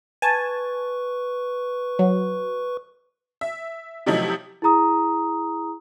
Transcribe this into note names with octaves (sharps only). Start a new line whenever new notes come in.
B4 G#5 A5 C#6
F#3
E5
C3 F3 F#3 A3 D#4 E4
E4 G#4 A#5 D#6